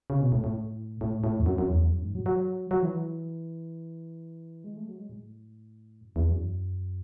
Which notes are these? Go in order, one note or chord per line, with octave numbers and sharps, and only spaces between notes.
C#3
B2
A2
A2
A2
A2
E2
F#2
F#2
E2
F#2
G#2
F#3
F#3
F#3
E3
G#3
A3
F#3
G#3
A2
F#2
E2
F#2